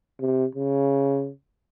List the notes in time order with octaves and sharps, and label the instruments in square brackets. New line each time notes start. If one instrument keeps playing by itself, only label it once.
[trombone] C3
C#3